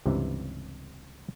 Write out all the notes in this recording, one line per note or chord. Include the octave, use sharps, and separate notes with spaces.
C#2 G2 C3 E3